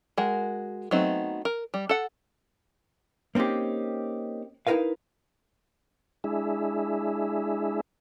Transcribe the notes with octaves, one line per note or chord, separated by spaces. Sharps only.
G#3 F#4 A#4
F#3 A3 B3 C4 D#4
A#4
G3
A4 F#5
A#3 C4 C#4 D#4 G4
D#4 E4 G4 A#4 B4 F5
G#3 D4 E4 G#4 E5